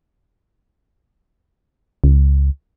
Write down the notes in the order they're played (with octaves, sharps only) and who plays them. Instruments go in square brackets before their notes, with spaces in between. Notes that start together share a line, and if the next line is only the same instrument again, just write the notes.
[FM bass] C#2